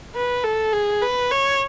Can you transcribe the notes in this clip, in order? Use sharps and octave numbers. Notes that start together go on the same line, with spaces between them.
B4
A4
G#4
B4
C#5